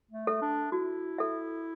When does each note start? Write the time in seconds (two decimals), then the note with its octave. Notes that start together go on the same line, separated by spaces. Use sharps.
0.11 A3
0.27 A4 E5
0.42 D4
0.72 E4 F#4
1.18 A4 E5